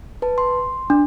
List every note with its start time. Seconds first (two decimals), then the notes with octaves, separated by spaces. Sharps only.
0.22 B4 A5
0.38 C6
0.90 D4